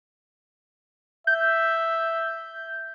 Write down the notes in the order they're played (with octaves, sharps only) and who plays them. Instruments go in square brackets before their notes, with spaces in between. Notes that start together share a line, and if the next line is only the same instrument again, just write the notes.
[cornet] E5 [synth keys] G6